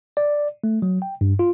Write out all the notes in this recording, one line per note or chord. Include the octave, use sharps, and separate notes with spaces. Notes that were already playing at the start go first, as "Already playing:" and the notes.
D5
A3
F#3
G5
G2
F4